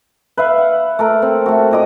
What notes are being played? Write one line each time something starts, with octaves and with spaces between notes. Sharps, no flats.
B4 E5 F5
F#5
A3 A4 A#4
C4
A3 F#4
A#2 D#5 D6